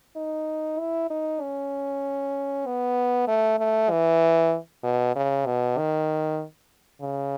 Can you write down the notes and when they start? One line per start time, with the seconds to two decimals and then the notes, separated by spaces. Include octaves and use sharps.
0.16 D#4
0.79 E4
1.10 D#4
1.41 C#4
2.66 B3
3.28 A3
3.59 A3
3.91 E3
4.83 B2
5.15 C#3
5.46 B2
5.78 D#3
7.02 C#3